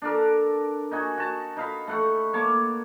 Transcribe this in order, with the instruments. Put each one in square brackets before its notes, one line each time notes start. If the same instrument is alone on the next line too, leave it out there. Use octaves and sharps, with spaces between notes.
[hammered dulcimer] D4 A4 A#4
D#4 F#4 G#5
F#4 A5
D#4 F5 B5
A3 F#5 C#6
A#3 C#5 A5 D6